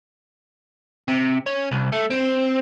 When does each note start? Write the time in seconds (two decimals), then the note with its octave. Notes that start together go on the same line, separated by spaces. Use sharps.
1.08 C3
1.46 C#4
1.71 C2
1.92 A3
2.10 C4